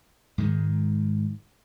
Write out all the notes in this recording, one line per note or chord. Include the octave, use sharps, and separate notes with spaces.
G#2 D#3 G#3